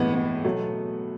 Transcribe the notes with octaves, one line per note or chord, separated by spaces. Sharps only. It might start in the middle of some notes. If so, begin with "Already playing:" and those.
Already playing: A2 E3 G#3 B3
B3
B2 F#3 A3